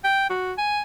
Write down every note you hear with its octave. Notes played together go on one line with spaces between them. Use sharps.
G5
F#4
G#5